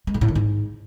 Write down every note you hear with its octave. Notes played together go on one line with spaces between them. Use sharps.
G#3
G#2
A2
D#3
G#2